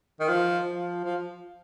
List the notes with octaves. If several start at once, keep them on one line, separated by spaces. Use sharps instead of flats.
D#3
F3
F3
F3